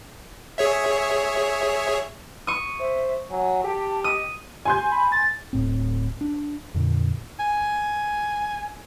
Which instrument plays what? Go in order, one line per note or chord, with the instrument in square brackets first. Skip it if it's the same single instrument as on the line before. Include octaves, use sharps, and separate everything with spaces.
[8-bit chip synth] G#4 C#5 E5
[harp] C#6 D#6
[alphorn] C5 [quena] E5
[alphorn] F#3 [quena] G#5
[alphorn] G4 [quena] A5
[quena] D#5 [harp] D#6
[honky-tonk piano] G#5 C6 G6
[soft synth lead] B5
A6
[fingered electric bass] D1 A2 C4
D4
F2 A#2 D3
[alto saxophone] G#5